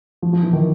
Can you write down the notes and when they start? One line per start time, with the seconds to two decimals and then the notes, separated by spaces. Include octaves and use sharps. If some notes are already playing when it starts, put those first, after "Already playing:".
0.22 F3
0.33 F3
0.43 E3
0.53 D#3